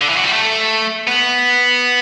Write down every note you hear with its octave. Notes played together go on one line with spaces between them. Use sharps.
D3
E3
F#3
G3
A3
B3